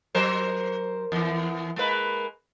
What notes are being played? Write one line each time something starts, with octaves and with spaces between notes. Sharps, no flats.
F#3 A#4 C5
E2 E3
G#3 A#3 B4